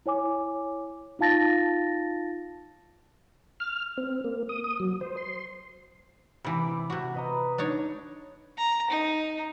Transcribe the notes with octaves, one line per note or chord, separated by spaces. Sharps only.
E4 C#5 G#5 D6
D#4 F4 F5 A5 A6 A#6
F6
C4
A#3
D#6
D#6
F#3
C5
C6
C3 E3 B5 D6
C3 F#4
B4 D#5 A#5
D4 D#4 C#5
A#5
D#4